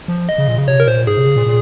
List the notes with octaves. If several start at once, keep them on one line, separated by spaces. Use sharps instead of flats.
F3
D#5
C#3
A#2
C#3
C3 C#5
A#4
A#2 C5
G#2 G#4
C3
C#3
A#2
A#2